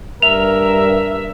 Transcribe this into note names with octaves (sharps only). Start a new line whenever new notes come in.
G2 A#4 E5 F7